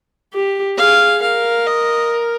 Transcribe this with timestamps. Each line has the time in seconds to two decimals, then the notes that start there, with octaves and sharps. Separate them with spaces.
0.33 G4
0.77 G#4 F5
1.22 A#4 F5
1.66 D#5